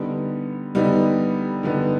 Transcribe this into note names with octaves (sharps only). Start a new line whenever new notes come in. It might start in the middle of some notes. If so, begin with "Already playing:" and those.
Already playing: D3 G3 B3 D#4
D3 G3 B3 D#4
D3 G3 B3 D#4